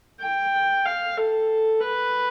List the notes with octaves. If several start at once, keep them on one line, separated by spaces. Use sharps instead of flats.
G5
F5
A4
B4